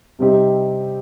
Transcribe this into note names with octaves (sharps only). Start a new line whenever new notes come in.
C3 G3 C4 D#4 G4